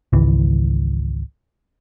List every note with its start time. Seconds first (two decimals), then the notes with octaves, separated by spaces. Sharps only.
0.13 G#1 C#2 E3